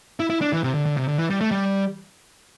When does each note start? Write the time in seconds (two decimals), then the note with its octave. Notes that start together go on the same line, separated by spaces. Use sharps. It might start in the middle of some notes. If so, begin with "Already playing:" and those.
0.20 E4
0.30 E4
0.41 D4
0.53 E3
0.63 C3
0.74 D3
0.86 D3
0.97 C3
1.08 D3
1.18 E3
1.30 G3
1.41 A3
1.51 G3